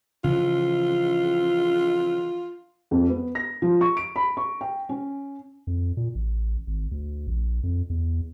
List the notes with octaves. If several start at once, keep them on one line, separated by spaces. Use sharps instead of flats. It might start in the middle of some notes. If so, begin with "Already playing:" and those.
C#3 E3 F3 F4
F2
B3
A#6
F3
C#6
D7
B5
C#6
G5
C#4
F2
A#2
A1
G#1
D2
A#1
F2
E2